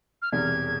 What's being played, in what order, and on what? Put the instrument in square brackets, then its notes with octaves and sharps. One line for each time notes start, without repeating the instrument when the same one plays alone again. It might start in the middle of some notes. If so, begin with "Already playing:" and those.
[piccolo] F6
[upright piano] E1 E2 C3 [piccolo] G#6